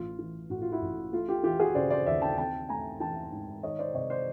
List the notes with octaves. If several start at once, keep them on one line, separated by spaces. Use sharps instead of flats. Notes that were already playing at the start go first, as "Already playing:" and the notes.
Already playing: A1 F4
E3
A2 F#4
F4
E4 F#4
A1
A3 F4
F4 G4
E3 F4 G4
F#4 G#4
C#3 C5 D5
C5 D5
D#2 D5 E5
G5 A5
C4 G5 A5
A3 G#5 A#5
E3 G5 A5
G#2
D#3 C#5 D#5
C5 D5
C3 C#5 D#5
C5 D5